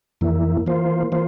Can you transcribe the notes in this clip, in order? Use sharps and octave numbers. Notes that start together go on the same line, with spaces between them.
F2 E3 A#3 E4
E3 A#3 F4 C5
E3 A#3 F4 C5